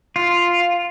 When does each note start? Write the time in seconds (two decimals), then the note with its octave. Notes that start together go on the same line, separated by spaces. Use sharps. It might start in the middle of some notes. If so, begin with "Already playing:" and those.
0.16 F4